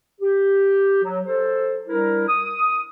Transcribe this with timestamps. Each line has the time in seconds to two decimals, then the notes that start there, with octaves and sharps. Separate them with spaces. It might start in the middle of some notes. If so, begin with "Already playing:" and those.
0.21 G4
1.03 F#3
1.26 A4 C5
1.87 G3 D4 E4 A#4
2.28 D#6